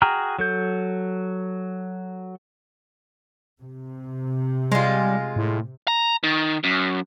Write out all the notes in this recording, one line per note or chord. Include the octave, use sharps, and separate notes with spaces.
F#4 G#4 G5 A#5 F6
F#3 A4 G6
C3
G3 G#3 F4
A2
A#5
D#3
F#2